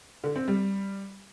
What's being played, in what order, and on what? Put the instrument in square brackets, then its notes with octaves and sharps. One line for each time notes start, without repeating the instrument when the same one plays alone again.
[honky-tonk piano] D3
C4
G3